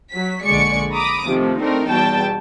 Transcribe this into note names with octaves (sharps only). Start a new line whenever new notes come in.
F#3 B6
A#1 D3 G#3 D5 C#6 C#7
A#5 B5 D6 D#6
C3 D#3 F3 A3
A3 C4 D4 D#4 A#4
E2 B2 G3 G5 A5